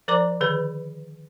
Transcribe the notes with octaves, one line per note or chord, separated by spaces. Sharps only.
F3 A#4 C5 D5 A#5 D6
D3 D#3 G#4 B4 C#5